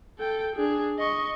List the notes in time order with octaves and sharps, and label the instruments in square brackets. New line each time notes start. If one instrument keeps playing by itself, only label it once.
[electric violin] A4 G5
D4 G#4
D#5 C#6